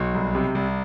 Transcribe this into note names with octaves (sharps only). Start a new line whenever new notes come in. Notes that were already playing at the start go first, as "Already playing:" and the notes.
Already playing: B1 F#4
C2
C3
C2